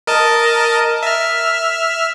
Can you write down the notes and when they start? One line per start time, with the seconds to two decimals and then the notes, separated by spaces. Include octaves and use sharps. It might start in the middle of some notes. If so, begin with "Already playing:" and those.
0.07 A#4 D#5 A5
1.03 E5 F6